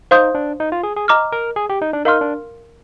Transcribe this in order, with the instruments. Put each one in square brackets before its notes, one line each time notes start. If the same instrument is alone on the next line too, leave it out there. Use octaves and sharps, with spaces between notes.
[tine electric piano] D#4 [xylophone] C5 F5 C6 D#6 G6
[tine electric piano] D4
D#4
F4
G#4
G#4
[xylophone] D#5 A#5 D6 F6
[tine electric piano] A#4
G#4
G4
D#4
D4
[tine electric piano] D#4 [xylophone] A#4 F5 C6 F6
[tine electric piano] D4